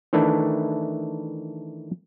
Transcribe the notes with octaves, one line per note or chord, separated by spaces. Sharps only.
D#3 E3 A3 D4 E4